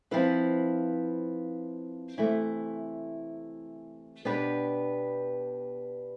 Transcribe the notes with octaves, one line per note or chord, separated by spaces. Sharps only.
F3 C4 E4 B4 F5
C3 E3 A3 E4
B2 B3 D4 G4 B4